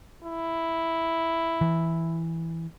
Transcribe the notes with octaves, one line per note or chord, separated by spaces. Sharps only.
E4
E3